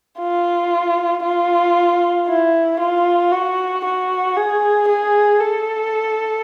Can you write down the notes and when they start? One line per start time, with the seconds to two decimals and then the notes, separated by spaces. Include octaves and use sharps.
0.19 F4
1.24 F4
2.28 E4
2.80 F4
3.32 F#4
3.85 F#4
4.37 G#4
4.88 G#4
5.40 A4